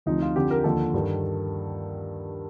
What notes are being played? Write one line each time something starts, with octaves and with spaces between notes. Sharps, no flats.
D2 C3 F3 D#4
F4
F2 D3 F3 G4
A#4
D#2 D3 F3 A4
G2 D#3